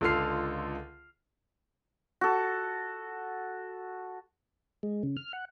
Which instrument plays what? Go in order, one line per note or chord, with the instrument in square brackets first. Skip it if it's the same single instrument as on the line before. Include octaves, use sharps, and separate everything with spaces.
[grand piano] C#2 D3 F4 A4 F6 C7
[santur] F#4 A4
[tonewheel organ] G#3
C#3
F6
F#5